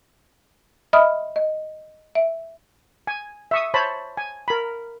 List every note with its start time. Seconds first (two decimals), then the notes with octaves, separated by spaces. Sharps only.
0.93 D#5 E5 B5 D#6 F6
1.36 D#5
2.15 E5
3.07 G#5
3.51 E5 C#6 D#6
3.74 C5 C#5 A5 B5
4.17 G#5
4.48 A#4 B5